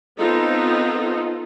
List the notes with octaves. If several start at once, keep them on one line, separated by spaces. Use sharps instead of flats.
B3 C4 D#4 F4 A4